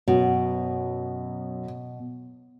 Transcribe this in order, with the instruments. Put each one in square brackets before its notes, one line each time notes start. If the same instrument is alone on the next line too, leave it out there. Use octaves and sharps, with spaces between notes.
[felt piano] F#2 [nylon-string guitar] B2